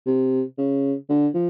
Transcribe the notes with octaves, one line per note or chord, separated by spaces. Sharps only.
C3
C#3
D3
F3